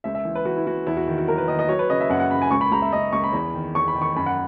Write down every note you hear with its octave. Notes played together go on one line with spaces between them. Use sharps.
C#2 E5
E5
E3
B4
E3 F#4
E4
E3 F#4
E2 E4
F#4
D#3
F#4
F#3 A#4
B4
D#3 D#5
D#5
F#3 C#5
B4
C#3 D#5
E5
F#2 F#5
F#5
C#3 B5
G#5
C#2 C#6
B5
C#2 A#5
E5
C#2 D#5
C#2 C#6
B5
E2
D#3
E2 C#6
B5
D#3
C#6
F#2 B5
F#5